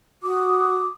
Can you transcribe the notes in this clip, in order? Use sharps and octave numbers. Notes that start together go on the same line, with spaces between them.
F#4 D6 D#6